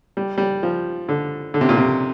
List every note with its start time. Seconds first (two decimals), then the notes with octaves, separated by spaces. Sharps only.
0.17 G3
0.38 G3
0.63 F3
1.09 D3
1.54 D3
1.61 C3
1.69 A#2
1.77 C3